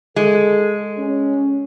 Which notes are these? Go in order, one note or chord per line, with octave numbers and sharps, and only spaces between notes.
G#3 G#4 A4
C#4